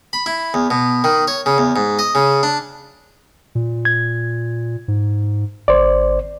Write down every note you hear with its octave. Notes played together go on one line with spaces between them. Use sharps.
B5
E4
E2
B2
D#3
C#5
C#3
E2
G#2
D#5
C#3
D4
A#2
G#6
G#2
G#1 C5 D5